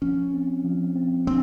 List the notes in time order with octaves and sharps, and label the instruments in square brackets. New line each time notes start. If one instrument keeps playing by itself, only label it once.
[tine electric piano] F3 [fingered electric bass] C#4
[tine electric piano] C4
F3
C4
[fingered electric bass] C4 [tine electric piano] D4